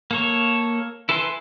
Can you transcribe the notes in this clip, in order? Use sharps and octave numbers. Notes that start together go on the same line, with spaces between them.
A#3 A4 C#5
E4 A4 B4 G#5 C6